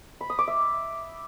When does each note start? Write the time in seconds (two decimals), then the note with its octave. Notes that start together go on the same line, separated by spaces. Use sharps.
0.21 B5
0.30 D#6
0.39 D6
0.47 E5